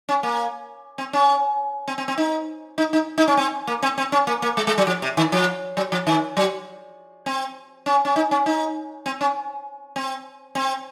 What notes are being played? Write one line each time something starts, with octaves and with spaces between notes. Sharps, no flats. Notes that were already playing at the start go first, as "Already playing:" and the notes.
C#4
A#3
C4
C#4
C4
C4
C4
D#4
D#4
D#4
D#4
C#4
C4
A#3
C4
C4
C#4
A#3
A#3
G#3
G#3
F#3
F3
C3
D#3
F3
F#3
F3
D#3
F#3
C4
C#4
C#4
D#4
C#4
D#4
C4
C#4
C4
C4